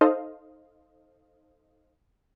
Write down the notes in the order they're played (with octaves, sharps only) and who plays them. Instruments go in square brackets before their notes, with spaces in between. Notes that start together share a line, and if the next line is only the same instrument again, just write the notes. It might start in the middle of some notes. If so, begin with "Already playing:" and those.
[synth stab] D#4 A4 C5 D#5 F5